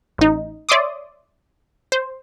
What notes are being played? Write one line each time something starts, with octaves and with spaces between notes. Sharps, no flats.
A1 D#4
C#5 D5 E5 C6 D6 D#6
C5